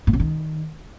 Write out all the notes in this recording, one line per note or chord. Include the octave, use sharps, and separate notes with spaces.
A2
C3
D#3